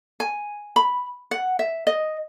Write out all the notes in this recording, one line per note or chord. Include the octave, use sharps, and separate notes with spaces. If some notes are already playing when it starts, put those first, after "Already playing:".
G#5
B5
F#5
E5
D#5